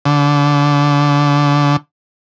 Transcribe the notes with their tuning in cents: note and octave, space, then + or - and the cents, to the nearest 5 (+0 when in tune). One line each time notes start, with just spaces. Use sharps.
D3 -25